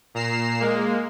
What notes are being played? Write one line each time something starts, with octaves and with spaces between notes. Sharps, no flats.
A#2 A#5 C7 E7
G#3 A#3